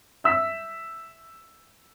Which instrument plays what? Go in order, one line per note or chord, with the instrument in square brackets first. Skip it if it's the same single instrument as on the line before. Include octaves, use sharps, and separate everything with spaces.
[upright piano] E5 E6 B6